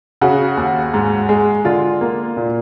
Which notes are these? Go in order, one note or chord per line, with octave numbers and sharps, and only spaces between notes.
C#3 F#4
D#2
G#2
G#3
D3 F4
A#3
A#2